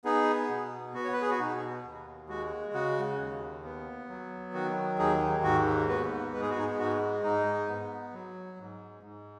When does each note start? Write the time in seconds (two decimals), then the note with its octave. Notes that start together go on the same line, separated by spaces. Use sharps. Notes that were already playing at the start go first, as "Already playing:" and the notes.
0.05 B3 D#4 G#4
0.49 B2
0.94 B3 F#4
1.04 C#5
1.13 B4
1.22 G#4
1.31 F#4
1.39 B2 D#4
1.84 D#2
2.29 G#3 F#4
2.74 C#3 F#4
3.19 D#2
3.64 B3
4.09 F#3
4.53 D#3 F#4
4.99 D#2 D#4 G#4
5.44 G#2 F#4
5.89 B3 F#4 B4
6.33 G#3 B4
6.42 G#4
6.50 F#4
6.58 D#4 G#4
6.78 G#2 F#4
7.23 G#2 D#4
7.68 B3
8.13 F#3
8.58 G#2
9.03 G#2